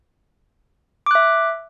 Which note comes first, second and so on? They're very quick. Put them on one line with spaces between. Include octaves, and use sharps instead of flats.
D6 F#6 E5